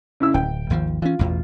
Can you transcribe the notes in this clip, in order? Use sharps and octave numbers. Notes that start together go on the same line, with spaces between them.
C#3 E4 E6
D1 G5
G#1 D#2 F3
E3 C#4 F4
A1 E2 B2